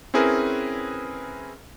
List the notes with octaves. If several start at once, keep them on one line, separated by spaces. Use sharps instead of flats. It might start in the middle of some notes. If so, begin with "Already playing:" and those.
C4 C#4 E4 G#4 A#4 B4